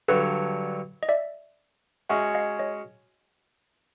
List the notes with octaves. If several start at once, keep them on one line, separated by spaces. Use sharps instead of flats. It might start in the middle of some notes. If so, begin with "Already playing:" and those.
G2 D3 F#3 A4 B4
D#5
D5 E5
G#3 C#4 F#4 E5 F#5
D#5 F5
C#5 D#5